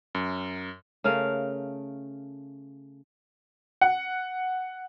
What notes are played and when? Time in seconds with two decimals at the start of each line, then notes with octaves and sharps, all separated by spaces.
0.15 F#2
1.04 C#3 A3 A#4 F5
3.81 F#5